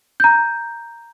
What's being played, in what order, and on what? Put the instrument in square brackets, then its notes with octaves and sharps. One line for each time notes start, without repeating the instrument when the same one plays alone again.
[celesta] A#5 G6